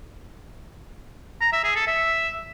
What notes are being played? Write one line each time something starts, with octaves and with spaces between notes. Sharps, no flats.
A#5
E5
G#4
A4
E5